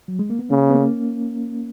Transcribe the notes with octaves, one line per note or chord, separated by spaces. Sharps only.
F#3
G#3
A#3
B3
C#3 A#3 C#4
B3
A#3 C#4